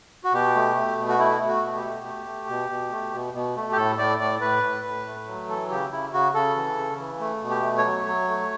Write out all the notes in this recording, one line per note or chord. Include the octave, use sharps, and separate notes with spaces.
F#4
B2 G4
A3
A3
B2
F#4
A3 E4
A3
F#4
B2
G4
A3
A3
A3
B2
B2
A3
B2
B2
A3
G4
A2 A4
A2 D5
A2 D5
A2 B4
A2
A2
A3
F#3
E3 A4
C#3 G4
C#3 E4
C#3 F#4
C#3 A4
E3
C#3
E3
A3
B2
G4
A3
C#5
F#3
F#3
A3